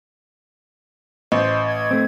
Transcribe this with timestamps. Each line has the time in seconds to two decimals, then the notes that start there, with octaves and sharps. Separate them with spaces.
1.32 A1 C5 D#5
1.65 G#6
1.91 A3 C4